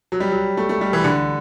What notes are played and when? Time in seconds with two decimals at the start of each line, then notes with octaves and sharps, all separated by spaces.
0.12 F#3
0.20 G3
0.31 F#3
0.57 A3
0.69 A3
0.81 G3
0.93 E3
1.04 D3